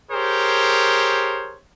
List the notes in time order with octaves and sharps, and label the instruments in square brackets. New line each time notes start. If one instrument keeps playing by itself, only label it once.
[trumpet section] G4 G#4 A#4 C5 C#5